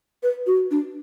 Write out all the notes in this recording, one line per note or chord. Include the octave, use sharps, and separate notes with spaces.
B4
F#4
D4